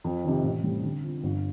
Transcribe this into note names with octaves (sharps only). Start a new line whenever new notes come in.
F2
C3 D#3
A1
A2 G3 C4
D3
F3 C4
G1